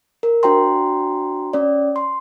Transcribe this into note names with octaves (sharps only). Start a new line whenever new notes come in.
A#4
D4 F#4 C5 G5 A#5 C6
C#4 D5
C6